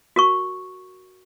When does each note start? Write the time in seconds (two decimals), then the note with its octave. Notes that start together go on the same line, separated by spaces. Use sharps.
0.16 F#4 A#4 C#6